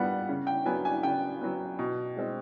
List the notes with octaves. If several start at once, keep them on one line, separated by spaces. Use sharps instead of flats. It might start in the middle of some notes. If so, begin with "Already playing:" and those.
Already playing: A#2 G3 B3 F#5
C#3
G5
F#3 B3 G#5
G#5
C#3 G5
F#3 B3
B2
G#3 C4